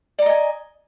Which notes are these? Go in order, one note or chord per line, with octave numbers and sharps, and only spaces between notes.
D5 D#5 G#5 A#5